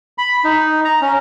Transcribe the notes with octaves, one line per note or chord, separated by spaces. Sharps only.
B5
D#4
A#5
C#4